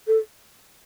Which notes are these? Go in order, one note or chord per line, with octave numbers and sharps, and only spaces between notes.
A4